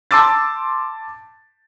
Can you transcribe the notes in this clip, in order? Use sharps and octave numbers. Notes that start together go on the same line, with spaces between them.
A5 C6 D6 E6 A6